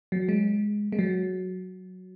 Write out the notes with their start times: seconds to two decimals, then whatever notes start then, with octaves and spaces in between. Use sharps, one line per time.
0.12 F#3
0.29 G#3
0.92 G#3
0.99 F#3